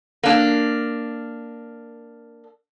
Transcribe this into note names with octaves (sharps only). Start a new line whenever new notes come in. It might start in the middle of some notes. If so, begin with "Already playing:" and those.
A#3 D4